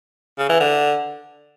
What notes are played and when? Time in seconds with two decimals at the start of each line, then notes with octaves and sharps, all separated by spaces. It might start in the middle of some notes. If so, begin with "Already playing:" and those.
0.39 C#3
0.49 E3
0.60 D3